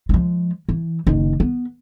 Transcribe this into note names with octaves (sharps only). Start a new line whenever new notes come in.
F3 G#3
E3
F#1 D#3
B3